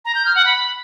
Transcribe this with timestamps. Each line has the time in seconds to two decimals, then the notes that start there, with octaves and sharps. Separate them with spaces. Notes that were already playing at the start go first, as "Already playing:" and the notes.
0.05 A#5
0.15 G6
0.25 F6
0.35 F#5
0.45 B5